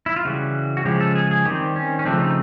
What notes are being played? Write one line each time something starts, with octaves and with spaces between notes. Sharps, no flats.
E4
F4
C#3 E3 G3 F#4
F#4
C#3 F3 G#3 G4
A4
G#4
G#4
D#3 G3 C4 G4
C#4
C#4
C#3 F3 A3 C4 D4
D#4